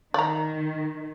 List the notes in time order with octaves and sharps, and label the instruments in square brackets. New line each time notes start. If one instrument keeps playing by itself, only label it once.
[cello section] D#3 [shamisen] D5 A#5